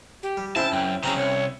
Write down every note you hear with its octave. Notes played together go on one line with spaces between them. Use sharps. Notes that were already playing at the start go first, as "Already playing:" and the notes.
G4
G3
C#3 C4 E4 C5 A5
F#2 G5
C#3 F#3 C4 C#4 G#4 A#5
C2 C#5